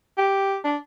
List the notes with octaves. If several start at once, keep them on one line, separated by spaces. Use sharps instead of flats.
G4
D4